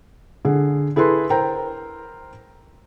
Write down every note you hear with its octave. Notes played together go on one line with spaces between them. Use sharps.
D3 G#4
E4 G#4 A4 B4 C6
A#4 C5 G5 A#5